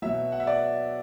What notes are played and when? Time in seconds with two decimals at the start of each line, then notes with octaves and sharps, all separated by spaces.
0.02 B2 F#3 E5
0.32 F#5
0.40 E5
0.47 D5